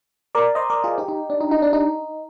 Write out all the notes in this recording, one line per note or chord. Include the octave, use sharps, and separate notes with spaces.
A#4 D5
C5 D#5
A#4 D5
F4 G#4
D#4 G4
D#4
D4
D#4
D#4
D4
D#4